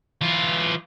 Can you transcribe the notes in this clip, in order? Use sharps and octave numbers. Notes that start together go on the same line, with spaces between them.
E3 F4